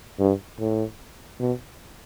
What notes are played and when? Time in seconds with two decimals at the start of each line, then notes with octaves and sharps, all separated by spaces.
0.19 G2
0.59 A2
1.39 B2